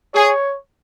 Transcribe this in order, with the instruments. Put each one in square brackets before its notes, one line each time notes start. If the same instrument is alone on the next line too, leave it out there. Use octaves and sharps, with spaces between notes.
[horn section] G#4 [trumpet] C#5